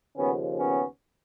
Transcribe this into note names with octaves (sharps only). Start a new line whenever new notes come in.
D#2 C#3 F3 B3 C#4
B3 C#4